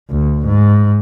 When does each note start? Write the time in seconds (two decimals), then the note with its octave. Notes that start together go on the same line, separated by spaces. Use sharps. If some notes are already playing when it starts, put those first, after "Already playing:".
0.11 D2
0.46 G#2